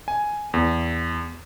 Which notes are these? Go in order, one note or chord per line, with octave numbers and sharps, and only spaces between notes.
G#5
E2